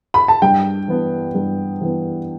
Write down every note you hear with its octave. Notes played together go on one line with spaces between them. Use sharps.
B5
A5
G2 G5
E3 B3
G2
E3 B3